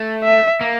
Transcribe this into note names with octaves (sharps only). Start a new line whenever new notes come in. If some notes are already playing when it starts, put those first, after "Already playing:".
Already playing: A3
E5
A#3